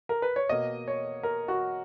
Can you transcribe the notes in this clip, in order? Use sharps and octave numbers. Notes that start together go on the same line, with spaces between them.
A#4
B4
C#5
B2 A#3 D#5
C#5
A#4
F#4